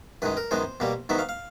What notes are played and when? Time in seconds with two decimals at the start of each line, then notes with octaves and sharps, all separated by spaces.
0.22 F#2 D#3 G#3 B4
0.37 A#4
0.51 F#2 D#3 G#3 B3 C5
0.80 B2 G3 A#3
1.09 G#2 D#3 F#3 B3 E5
1.19 F5
1.29 F5